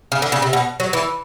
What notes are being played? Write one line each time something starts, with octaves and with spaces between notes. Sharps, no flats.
C#3
D3
C#3
C3
B2
F#3
E3